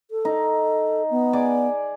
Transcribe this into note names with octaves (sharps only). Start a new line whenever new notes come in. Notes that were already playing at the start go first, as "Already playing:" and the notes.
A4
D#4
B3
G#4 D5 D6